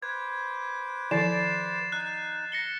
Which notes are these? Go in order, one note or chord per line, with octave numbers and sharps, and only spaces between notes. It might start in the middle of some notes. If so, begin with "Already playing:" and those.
B4 C5 D6 G#6
D#3 F3 E4 D5 A6 C7 E7
D#4 F#6
A#6 C#7 G7